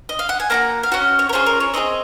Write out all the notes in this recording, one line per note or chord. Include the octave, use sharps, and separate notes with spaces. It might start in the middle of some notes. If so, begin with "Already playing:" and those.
D#5
F5
F#5
G#5
A#3 D#4 F#4 A#5
F5
C#4 F#4 F#5
C#5
A#4
C#4 F4 G#4 C5
A#4
C#5
C4 D#4 G#4 D#5